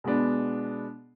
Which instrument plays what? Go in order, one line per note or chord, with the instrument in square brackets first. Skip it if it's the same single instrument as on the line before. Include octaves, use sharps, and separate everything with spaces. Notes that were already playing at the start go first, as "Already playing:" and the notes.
[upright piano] B2 G#3 B3 D4